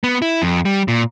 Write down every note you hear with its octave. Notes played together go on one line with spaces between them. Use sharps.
B3
E4
F2
G3
A#2